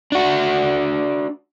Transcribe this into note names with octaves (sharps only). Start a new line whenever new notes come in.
D4 F#4